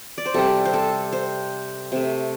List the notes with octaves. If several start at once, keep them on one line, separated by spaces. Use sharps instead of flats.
D5
C5
C3 G3 A4
C5
A4
C5
C3 A3